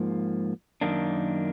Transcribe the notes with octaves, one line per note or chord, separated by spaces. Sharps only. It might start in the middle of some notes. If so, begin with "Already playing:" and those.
Already playing: G#2 F3 A#3
F#2 D#3 A#3 D4